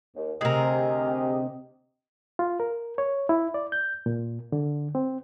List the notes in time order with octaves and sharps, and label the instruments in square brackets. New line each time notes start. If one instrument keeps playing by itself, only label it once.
[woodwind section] D#2
[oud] D2 C3 [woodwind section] G4 D#5 [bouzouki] G#4 A#4
[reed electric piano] F4
A#4
C#5
E4
D5
G6
A#2
D3
C4